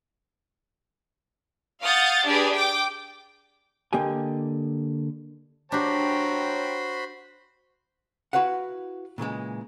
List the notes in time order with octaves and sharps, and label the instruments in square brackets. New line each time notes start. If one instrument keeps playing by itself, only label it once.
[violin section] F5 F#5 D#6 G6 A6
D4 G4 G#4 B4 D5
G5 D6
[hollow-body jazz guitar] D3 A#3 G4 D#5 G#5
[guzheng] D4 G4 [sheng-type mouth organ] F#4 C5 B5 [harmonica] C#5 G5 A#5
[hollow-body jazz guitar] E4 F#4 B4 F5 F#5
A#2 C#3 E3 G#3